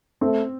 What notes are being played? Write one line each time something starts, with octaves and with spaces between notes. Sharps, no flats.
A3 C4